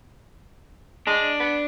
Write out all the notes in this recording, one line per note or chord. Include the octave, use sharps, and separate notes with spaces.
G#3 D4
B3